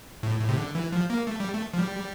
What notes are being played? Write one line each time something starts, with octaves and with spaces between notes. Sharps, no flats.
A2
A2
C3
D3
E3
F3
A#3
A3
G3
A3
F3
G3